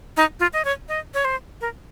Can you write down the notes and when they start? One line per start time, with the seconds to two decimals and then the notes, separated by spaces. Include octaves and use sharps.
0.17 D#4
0.40 F4
0.53 D#5
0.65 C#5
0.89 D#5
1.14 C#5
1.25 C5
1.61 A#4